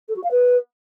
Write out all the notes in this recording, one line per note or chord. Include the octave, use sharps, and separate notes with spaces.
A4
F#4
F5
B4